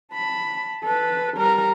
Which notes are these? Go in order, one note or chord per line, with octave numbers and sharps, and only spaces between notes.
A5 B5
A4 B4
G3 A#4